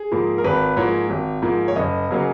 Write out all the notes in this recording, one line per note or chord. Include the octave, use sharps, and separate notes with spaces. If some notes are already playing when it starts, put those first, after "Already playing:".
Already playing: G#4
G#2 F3 A#3
A#4
G#1 B4
G#2 F3 A#3 C#5
G#1
G#2 F3 A#3
C#5
F#1 D#5
C#3 F#3 A#3